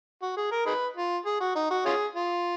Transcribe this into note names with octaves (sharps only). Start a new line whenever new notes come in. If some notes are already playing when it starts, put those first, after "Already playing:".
F#4
G#4
A#4
D#4 G#4 B4
F4
G#4
F#4
D#4
F#4
C#4 F4 G#4
F4